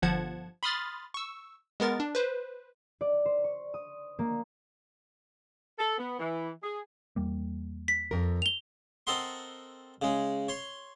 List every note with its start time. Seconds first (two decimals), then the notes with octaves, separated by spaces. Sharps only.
0.02 G1 F3 F#5 A5 G#6
0.63 B5 C6 D#6 F6 A6
1.14 C#6 E6
1.80 G#3 B3 A#4 A6
2.00 D4
2.15 B4 C5
3.01 D5
3.26 C5
3.44 C#6
3.74 D#6
4.19 A#3
5.79 A4
5.98 B3
6.19 E3
6.63 G#4
7.16 E2 G3 A#3
7.88 B6
8.11 F2 A#4
8.42 F7 G7
9.07 C4 A4 A#4 D#5 F#5 C6
10.02 C#3 G#3
10.48 C#5 C6